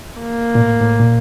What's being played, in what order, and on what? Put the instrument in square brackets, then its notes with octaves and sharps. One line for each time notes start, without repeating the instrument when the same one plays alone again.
[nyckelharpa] A#3
[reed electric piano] A#2
A2
A2
A#2